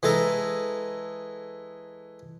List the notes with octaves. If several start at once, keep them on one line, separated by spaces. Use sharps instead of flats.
E3 G#3 A4 A#5